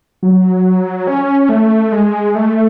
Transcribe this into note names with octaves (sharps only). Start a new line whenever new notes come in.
F#3
C#4
A3
G#3
A3